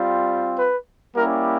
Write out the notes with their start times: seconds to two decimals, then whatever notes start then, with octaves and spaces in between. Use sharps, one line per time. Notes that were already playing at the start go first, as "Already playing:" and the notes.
Already playing: G3 C4 F4
0.59 B4
1.15 G3 A#3 C#4 E4 G4 A#4